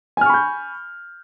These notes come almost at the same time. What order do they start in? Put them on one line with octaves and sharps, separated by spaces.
G#5 F6 C#6 B5 G6